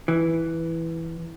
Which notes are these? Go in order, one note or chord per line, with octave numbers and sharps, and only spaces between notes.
E3